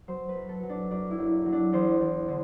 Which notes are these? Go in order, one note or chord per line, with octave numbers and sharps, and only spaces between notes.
F#3 C5
B4
F#2
A4
F#3
D4
F#2 D4
E4
F#1
F#3
D4
E2 C5
E2
D3